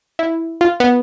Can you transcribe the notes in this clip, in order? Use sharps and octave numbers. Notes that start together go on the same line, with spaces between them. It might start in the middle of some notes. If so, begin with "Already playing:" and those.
E4
F4
B3